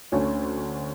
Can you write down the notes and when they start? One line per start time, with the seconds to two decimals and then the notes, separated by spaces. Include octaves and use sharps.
0.12 D2 D3 A3 C#4